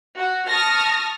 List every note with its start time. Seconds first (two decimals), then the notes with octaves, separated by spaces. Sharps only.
0.17 F#4
0.49 A5 C#6 D#6 F6 A#6